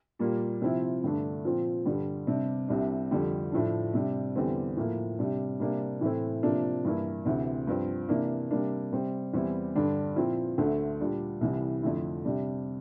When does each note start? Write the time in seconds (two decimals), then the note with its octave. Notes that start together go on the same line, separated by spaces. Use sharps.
0.19 A#2 G3 A#3
0.61 C3 F3 C4 E4
1.04 G2 D3 A3 D4
1.45 A#2 F3 C4
1.85 G2 D3 G3
2.27 C3 G3 D4
2.68 C2 C3 G3 D4
3.11 F2 D3 G3
3.52 A2 F3 A3 D4
3.94 C3 G3 D4
4.36 E2 D3 G3 C4
4.77 A2 F3 A#3
5.19 C3 G3 D4
5.60 C3 G3 A#3 D4
6.01 A2 E3 A3 C4 E4
6.43 C3 F3 A#3 D4
6.85 G2 E3 A#3 E4
7.25 D2 C3 E3
7.67 G2 F3 C4
8.09 C3 E3 A#3 D4
8.51 C3 G3 A#3 D4
8.92 C3 G3 C4
9.34 E2 E3 G3 C4 E4
9.75 G2 D3 G3 D4
10.16 A#2 F3 C4 E4
10.58 D2 D3 A3
11.00 A#2 G3 D4
11.41 C2 C3 E3 G3
11.83 F2 D3 A3 E4
12.25 C3 G3 D4